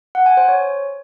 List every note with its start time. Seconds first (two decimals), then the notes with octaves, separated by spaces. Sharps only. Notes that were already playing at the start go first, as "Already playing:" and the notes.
0.15 F#5
0.26 G#5
0.37 C5
0.48 C#5